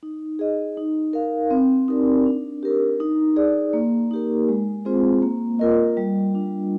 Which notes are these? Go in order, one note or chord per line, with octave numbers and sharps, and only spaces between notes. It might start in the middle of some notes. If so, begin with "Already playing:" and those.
D#4
G#4 D#5
D#4
A#4 F5
C4
D#4 G4 A#4 D5
D4
G4 A#4
D#4
G#4 D5
A#3
D#4 G4 A#4
G#3
C4 F4 G#4 C5
A#3
F4 A#4 D#5
G3
D4 F4